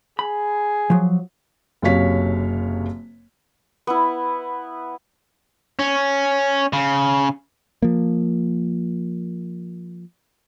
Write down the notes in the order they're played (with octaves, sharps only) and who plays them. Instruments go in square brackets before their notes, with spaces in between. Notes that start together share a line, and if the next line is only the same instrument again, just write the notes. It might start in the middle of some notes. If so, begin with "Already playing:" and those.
[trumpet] G#4 [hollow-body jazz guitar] B5
[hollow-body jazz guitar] F3 F#3
[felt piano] F#1 F#2 C3 C#5 F5 B6
[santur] B3 E4
[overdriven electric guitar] C#4
C#3
[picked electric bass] F3 A#3